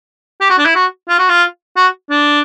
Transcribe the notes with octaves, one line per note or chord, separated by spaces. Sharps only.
G4
F#4
D4
E4
F#4
F4
F#4
F4
F#4
D4